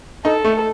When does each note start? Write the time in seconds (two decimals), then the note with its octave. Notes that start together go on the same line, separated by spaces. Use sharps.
0.25 D#4 A4
0.44 A3